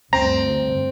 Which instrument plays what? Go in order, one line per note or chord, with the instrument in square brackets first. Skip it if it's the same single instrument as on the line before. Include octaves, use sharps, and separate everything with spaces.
[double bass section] D2 G2 [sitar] C4 [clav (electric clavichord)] A#5